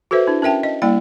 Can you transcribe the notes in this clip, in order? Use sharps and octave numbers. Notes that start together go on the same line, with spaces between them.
F#4 A4 B4 C5 E5
D4 E4
C#4 A#4 E5 G5 A5
D#5
G3 A#3 E4 D5 G5